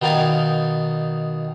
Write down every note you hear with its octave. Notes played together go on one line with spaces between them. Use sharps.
B2 D#3 D#4 D5 F5 G#5